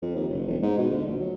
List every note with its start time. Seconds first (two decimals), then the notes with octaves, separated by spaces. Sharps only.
0.02 F2
0.15 D#2
0.28 F#1
0.47 E1
0.62 G#2
0.78 B2
0.91 D2
1.06 A#1
1.20 F#3